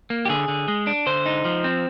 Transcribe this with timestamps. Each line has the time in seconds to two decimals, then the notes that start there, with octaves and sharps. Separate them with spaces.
0.10 A#3
0.25 G4
0.29 D3 G#4
0.48 D3
0.68 G#3
0.87 D4
1.07 D3 C5
1.26 D#4
1.45 F3
1.64 C4